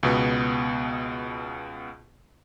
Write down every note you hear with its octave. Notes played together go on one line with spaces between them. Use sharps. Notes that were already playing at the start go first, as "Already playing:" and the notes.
C#2 B2 B3